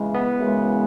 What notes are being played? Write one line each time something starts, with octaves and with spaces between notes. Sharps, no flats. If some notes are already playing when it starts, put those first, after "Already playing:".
Already playing: C#3 E3 G#3
B3
F#2 C#3 E3 G#3